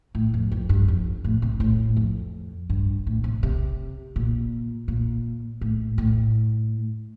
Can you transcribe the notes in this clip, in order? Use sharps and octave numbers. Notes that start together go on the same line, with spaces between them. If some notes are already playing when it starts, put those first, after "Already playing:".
A2
F2
F2
G2
F2
A2
C3
A2
F2
G2
A2
C3
C3
A#2
A#2
A2
A2